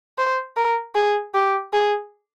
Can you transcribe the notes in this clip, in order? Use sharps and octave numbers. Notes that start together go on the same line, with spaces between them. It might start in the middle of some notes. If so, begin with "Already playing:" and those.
C5
A#4
G#4
G4
G#4